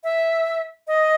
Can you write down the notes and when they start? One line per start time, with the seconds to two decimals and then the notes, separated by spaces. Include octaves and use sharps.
0.04 E5
0.88 D#5